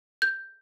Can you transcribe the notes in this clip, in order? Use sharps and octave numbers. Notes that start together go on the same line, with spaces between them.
G6